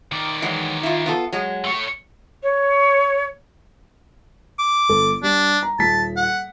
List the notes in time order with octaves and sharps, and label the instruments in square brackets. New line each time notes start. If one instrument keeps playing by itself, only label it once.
[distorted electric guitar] D#3 D5
[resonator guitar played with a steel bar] E3 F#3 G#3
E4 F4
B3 F4 A4
F#3 G#3
[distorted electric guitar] A3 C#5
[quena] C#5
[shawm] D6
[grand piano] G1 A4
[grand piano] G3 [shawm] D4
[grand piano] A#5
[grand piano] D#1 B6 [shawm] A5
[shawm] F#5